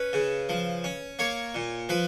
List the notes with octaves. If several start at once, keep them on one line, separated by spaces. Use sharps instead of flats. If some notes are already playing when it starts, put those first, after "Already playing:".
Already playing: C#4 B4
C#3
F3
C#4
A#3 C#5
A#2
F3 B4